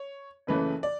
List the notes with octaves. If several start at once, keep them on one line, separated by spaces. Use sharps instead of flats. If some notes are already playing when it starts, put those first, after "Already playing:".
Already playing: C#5
F#1 F#2 C#3 E3 A3 B4
D5